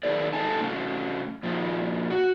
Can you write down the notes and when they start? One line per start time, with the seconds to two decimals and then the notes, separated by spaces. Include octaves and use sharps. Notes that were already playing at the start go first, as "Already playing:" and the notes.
0.03 D#3 B3 D#4 G#4 A#4 D5
0.33 G#2 D#4 A4 G#5 A5
0.61 C3 A3 C#4
1.43 A#2 F3 A#3 D#4
2.10 F#4